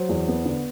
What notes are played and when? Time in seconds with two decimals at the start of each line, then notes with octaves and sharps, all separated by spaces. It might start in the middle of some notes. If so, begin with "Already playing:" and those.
Already playing: F#3 C5
0.09 E2
0.28 B3
0.45 D3